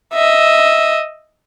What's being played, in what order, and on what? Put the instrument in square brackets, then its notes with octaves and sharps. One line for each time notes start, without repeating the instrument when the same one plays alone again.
[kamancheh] D#5 E5